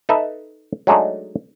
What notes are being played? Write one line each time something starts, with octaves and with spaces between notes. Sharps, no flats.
D#4 A4 B4 D#5 E5
F#3 G#3 A3 D4 D#4